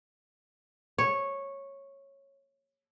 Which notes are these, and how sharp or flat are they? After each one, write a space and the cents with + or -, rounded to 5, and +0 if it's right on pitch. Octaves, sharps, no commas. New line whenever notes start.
C#5 -10